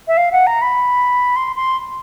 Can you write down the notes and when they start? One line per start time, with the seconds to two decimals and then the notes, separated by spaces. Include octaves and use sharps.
0.08 E5
0.17 F5
0.32 F#5
0.47 A#5
0.62 B5
1.36 C6
1.56 C6